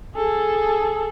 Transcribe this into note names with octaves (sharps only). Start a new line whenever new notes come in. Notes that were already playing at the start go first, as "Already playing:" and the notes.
G#4 A4